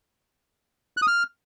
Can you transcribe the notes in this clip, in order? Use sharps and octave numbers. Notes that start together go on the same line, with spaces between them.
F#6
D#6
F6